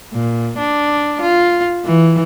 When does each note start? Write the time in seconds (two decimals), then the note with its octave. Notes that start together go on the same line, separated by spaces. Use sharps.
0.13 A#2
0.58 D4
1.21 F4
1.85 E3